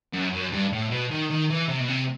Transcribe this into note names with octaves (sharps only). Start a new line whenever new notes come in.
F#2
F#2
G2
A2
B2
D#3
D#3
E3
C3
B2
C3